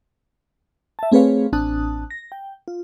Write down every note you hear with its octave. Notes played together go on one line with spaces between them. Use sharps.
E5 A5
A3 C4 G#4 B4 C#5 F5
A1 C4 D4 A5 D#6 F#6
A#6
G5
F4